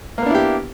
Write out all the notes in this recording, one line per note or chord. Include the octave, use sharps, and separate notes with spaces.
A#3 B3 D4 E4 G4